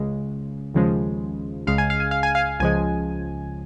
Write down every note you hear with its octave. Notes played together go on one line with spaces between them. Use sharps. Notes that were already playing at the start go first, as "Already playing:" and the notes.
Already playing: C#2 C#3 G#3
D#2 C#3 F3 G#3
C#2 C#3 G#3 F5
G#5
F5
G#5
F5
G#5
F5
C#2 C#3 F3 G#3 G#5